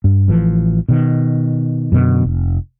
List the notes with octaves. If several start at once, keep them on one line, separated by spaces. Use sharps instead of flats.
G2
A1 E3 F3
B2 D#3
F#2 B2 D3
F1